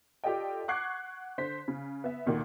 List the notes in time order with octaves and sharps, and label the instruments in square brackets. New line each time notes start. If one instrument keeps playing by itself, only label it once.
[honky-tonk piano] F4 G4 A4 D5 D#5 G5
F#5 C#6 D6 F#6 G#6 C7
D3 C5 B6
C#3
B3 E5
D2 A#2 D#3